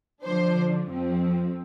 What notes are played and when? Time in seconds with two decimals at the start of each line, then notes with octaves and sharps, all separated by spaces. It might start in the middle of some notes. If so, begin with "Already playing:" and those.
0.23 D3 F3 D4 C5
0.88 F2 F3 C4